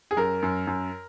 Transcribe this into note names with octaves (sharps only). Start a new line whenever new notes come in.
G#4
F#2 A#4
F#2
F#2